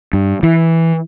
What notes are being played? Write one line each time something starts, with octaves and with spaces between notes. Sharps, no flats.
G2
E3